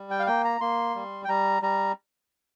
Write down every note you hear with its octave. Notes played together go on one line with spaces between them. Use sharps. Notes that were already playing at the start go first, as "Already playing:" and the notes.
Already playing: G3
G5
F5
A#3 G5
A#5
A#3 C6
G3
G5
G3 A#5
G3 A#5